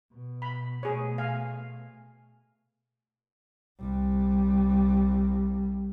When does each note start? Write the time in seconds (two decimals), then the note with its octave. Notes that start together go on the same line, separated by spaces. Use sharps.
0.12 B2
0.42 B5
0.83 B2 A3 G#4 C#5
1.18 F5 G#5
3.80 C2 G3